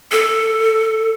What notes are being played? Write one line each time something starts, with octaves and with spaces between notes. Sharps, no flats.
A4